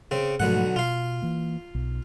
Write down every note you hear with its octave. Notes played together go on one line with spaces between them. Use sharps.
C#3 C4
B1 G#2 D3 F3 A3 F#5
B2 F4 F5
E3 A#3
B1